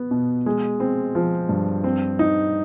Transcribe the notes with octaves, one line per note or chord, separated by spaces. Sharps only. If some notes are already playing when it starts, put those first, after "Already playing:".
Already playing: B3
B2
G#3
C4
F3
G2
C4
D#4